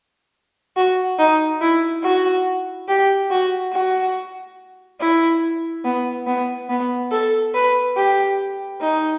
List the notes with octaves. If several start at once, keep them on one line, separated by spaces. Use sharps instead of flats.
F#4
D#4
E4
F#4
G4
F#4
F#4
E4
B3
B3
B3
A4
B4
G4
D#4